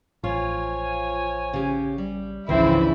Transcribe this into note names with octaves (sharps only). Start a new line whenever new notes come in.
A1 F3 F4 C#5 G#5
C#3 G4
G3
G#1 C#2 C#3 E3 F3 C4 D4 E4